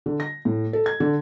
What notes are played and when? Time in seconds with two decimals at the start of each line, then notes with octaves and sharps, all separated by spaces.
0.06 D3
0.20 A#6
0.45 A2
0.73 A4
0.86 G#6
1.00 D3